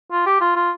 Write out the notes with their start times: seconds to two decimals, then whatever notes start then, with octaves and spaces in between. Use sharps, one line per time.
0.11 F4
0.26 G4
0.41 F4
0.55 F4